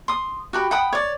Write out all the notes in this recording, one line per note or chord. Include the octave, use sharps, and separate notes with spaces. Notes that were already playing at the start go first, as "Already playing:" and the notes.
C6 D#6
F#4 G4 B5
F#5 G5 B5 D#6
C#5 D5